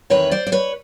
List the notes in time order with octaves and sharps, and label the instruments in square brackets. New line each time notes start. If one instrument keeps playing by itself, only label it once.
[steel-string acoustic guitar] E2 C3 D#3 B4 C#5
C5 D5
D5
B4 C#5